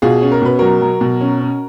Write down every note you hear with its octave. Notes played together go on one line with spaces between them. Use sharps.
B2 F4 G#4
C#4
A#4
B2 B4
F#3 F#4 A#4
F#3
B2
C#4
C#4